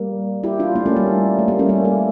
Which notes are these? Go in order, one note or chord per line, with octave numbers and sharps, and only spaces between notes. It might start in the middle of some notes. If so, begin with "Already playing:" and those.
Already playing: G3 A#3
E4 G4
D4 F4
A#3 D4
A3 C#4
G3 A#3
A3
G3 A#3
A3 C#4
G3 A#3
A3